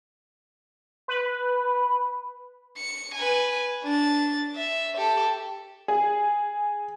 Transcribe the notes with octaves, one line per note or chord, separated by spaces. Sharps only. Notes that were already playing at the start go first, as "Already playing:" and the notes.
B4
C#7
B4 G#5
D4 A6
E5
G4 A4
G#4